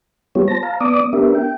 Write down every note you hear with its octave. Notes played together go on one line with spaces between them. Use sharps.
G3 B3 F4 G4 C#5
C5 A5 A#6
F5 A5 A#5
B3 D5 D6 D#6
B3 D4 G4 A#4 E5
G5